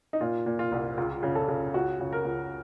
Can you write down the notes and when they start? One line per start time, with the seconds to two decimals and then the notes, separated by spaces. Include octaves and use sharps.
0.13 D#4
0.21 A#2 F4
0.46 A#2
0.59 F4
0.72 C2
0.97 C#2 F4
1.23 C#3
1.35 A4
1.48 C#3
1.74 C#2 F#4
2.00 C#3
2.13 A#4
2.25 C#2